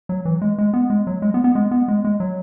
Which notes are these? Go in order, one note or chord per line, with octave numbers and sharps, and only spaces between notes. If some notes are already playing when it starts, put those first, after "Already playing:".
F#3
E3
G#3
G#3
B3
G#3
F#3
G#3
B3
B3
G#3
B3
G#3
G#3
F#3